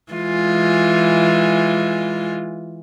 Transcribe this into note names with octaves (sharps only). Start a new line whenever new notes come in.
E3 G#3 F4